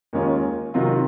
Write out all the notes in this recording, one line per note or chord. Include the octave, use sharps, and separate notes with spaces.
D#2 D#3 G#3 C#4 F4
C3 D#3 F#3 C4 F4